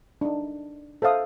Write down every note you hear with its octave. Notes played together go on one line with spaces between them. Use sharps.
D4 D#4
A4 C5 E5 F5 D#6